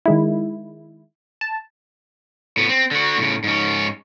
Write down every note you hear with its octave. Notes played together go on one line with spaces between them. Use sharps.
D#3 G#3 E4
A5
A2 B3
C4
D3 F#4
A2 C#3
G#2 C#4